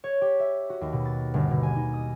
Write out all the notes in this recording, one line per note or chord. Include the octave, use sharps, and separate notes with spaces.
C#5
G4
E5
F#4
D#2
B2
A6
G1
B2
G#5
D#4
D#6